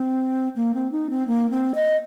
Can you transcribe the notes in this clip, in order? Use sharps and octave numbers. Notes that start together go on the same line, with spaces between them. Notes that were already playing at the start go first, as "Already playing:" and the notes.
Already playing: C4
A#3
C4
D#4
C4
A#3
C4
D#5